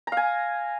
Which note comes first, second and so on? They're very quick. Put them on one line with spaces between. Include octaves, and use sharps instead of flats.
A#5 F5 G#5